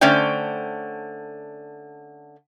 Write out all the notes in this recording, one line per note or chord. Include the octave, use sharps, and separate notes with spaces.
D3 A3 C#4 C5 D5 G5